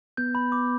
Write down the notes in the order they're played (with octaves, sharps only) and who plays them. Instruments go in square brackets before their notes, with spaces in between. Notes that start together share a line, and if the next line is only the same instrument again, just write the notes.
[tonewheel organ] B3 [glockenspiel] G6
[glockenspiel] B5
D6